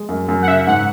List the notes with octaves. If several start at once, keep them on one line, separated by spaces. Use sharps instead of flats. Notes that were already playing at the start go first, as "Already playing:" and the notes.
Already playing: G#3
F#2
F#2
F#5
C#3 E5
G#2 F#5